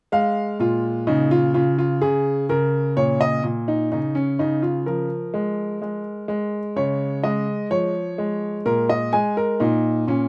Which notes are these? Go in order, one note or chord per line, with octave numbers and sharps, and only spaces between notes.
G#3 F5
A#2 F4
C#3 D#4
F4
C#3 F4
F4
C#3 G#4
C#3 A#4
A#2 C#5
D#5
A#2
D#4
C#3 D#4
C#4
C#3 D#4
F4
F3 A#4
G#3
G#3
G#3
C#3 C#5
G#3 D#5
F3 C#5
G#3
A#2 A#4
D#5
G#3 G#5
A#4
A#2 D#4
A#2 C#4